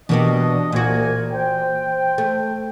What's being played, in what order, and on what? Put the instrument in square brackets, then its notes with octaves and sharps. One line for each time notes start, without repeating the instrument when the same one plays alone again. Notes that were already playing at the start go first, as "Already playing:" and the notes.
[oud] B2 A#3 G4 [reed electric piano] E3 [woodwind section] D4 D#5
[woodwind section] C2 A#3 G#5 [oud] A#2 F#4
[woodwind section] C5 G5
[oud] A3